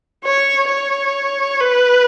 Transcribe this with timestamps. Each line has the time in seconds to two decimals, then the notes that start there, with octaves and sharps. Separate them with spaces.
0.24 C#5
0.69 C#5
1.61 B4